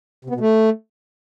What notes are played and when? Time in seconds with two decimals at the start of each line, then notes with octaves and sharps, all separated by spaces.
0.25 C3
0.30 B3
0.35 B2
0.40 A3